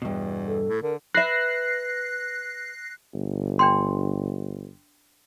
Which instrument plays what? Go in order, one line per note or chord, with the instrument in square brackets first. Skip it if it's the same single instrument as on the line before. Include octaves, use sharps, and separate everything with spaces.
[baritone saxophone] E2 [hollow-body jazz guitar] G2 B2
[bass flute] A4
[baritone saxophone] A2
[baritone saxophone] D3 [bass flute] A#4
[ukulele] B4 E5 [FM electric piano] F#6 A#6 C7
[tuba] G1
[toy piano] D4 G5 C6